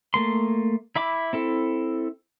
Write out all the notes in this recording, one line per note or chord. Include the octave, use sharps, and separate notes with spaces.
A3 A#3 C6
E4 E5 B5 D6
C4 E4 A4